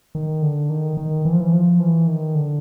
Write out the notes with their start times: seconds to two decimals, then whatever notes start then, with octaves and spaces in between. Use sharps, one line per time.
0.15 D#3
0.42 D3
0.70 D#3
0.97 D#3
1.25 E3
1.33 F3
1.41 E3
1.53 F3
1.80 E3
2.07 D#3
2.35 D3